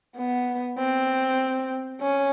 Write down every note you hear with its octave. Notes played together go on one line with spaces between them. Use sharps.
B3
C4
C#4